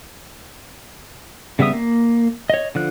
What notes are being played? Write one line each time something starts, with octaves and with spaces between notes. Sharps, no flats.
C#3 G3 B3 E5 D#6
A#3
C#5 D#5
D3 F3 F#6